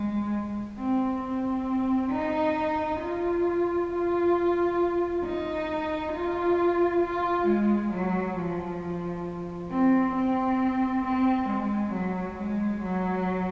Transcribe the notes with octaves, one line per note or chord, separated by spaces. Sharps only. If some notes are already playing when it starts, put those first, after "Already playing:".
Already playing: G#3
C4
C4
D#4
F4
F4
D#4
F4
F4
G#3
F#3
F3
C4
C4
C4
G#3
F#3
G#3
F#3